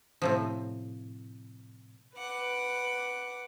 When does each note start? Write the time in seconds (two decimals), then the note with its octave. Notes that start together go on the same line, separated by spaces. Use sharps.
0.22 A2 C3 F3
2.17 B4 F#5 D6